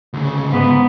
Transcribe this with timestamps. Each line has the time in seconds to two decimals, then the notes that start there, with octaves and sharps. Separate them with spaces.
0.13 D2 C#3
0.51 G#2 B3